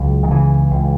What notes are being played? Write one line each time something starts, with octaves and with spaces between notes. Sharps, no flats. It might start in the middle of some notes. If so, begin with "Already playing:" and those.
Already playing: C#2 F#3
D#3
C#3 E3
C#2